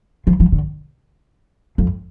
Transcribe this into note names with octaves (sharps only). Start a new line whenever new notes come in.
F3
F3
D3
F2